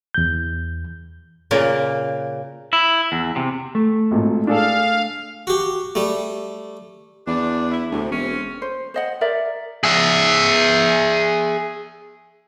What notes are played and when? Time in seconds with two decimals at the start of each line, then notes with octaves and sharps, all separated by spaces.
0.14 E2 G6
1.51 A#2 C#3 A#3
2.73 E4
3.12 E2
3.36 C3
3.75 A3
4.11 G#1 A#2
4.47 D4 G#4 A4 F5
5.47 F#4 G4
5.95 G3 A3
7.27 E2 D4
7.71 E4
7.91 D2 A2 C3
8.11 E1 C4 C#4
8.62 C5
8.94 C5 D#5 F#5
9.21 A#4 D5 E5
9.84 G#4 E5